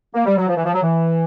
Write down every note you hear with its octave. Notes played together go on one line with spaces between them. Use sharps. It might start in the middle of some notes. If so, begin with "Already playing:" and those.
A#3
G3
F#3
F3
E3
F3
F#3
E3